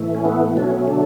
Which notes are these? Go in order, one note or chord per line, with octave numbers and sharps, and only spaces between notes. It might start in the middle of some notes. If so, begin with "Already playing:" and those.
Already playing: A2 E3 A3
C#4
B3
B2 F#3 A3 D4
C#4
B3
C#4
D3 D4